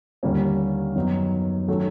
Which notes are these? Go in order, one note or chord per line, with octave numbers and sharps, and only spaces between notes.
D#2 D3 G3 A#3 C#4
F#2 D#3 F#3 B3 D#4
D#3 F#3 A3 C#4